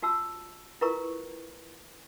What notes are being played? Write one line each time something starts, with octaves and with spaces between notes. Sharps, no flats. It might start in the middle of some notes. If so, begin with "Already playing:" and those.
F4 F#4 A5 E6
E4 F4 A#4 B4 A#5 C#6